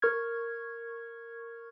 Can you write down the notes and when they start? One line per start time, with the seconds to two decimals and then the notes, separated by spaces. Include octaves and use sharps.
0.02 A#4 C#6 F6 G#6